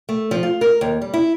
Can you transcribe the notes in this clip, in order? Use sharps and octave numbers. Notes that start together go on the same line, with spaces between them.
A3
F3
F4
A#4
D#2
G3
E4